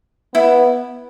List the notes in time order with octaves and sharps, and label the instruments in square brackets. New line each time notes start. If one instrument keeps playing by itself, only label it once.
[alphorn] B3 [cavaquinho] E4